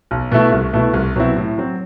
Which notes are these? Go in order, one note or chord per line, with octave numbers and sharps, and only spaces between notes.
B1
B2 A3 E4
C2
B2 A3 E4
C2
B2 F#3 C4 E4
A2
F#3 C4